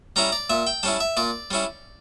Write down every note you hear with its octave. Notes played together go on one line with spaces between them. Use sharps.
G3 C#4 E4 A#5
D5
A#2 E5
G5
G3 C#4 E4 A5
E5
A#2 D5
G3 C#4 E4